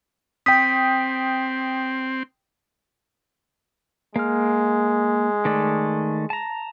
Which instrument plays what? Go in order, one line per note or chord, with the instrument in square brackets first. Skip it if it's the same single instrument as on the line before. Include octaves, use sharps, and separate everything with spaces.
[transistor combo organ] C4 [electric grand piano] G5 D#6 [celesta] B6
[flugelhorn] G#3 [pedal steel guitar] A#3 F6
[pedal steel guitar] D#3 A3 D5
A5 A#5